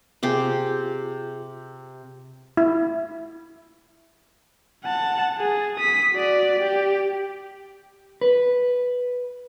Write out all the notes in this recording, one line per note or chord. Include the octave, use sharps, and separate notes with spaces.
C3 F4 G4 G#4 C5
E4
F#5 A5
G#4
D#6 B6
F#4 D5
G4
B4